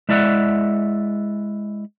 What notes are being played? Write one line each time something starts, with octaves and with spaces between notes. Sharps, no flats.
G#3 E4 D5 E5 F#5